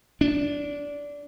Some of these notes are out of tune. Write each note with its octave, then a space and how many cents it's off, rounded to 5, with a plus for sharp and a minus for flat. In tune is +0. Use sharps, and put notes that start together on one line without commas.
D4 -15